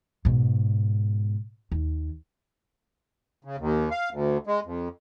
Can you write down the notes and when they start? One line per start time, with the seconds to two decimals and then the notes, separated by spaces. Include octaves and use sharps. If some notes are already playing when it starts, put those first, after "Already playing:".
0.25 G#2 B2
1.72 D#2
3.45 C#3
3.59 D#2
3.91 F5
4.11 D2
4.47 G#3
4.66 F2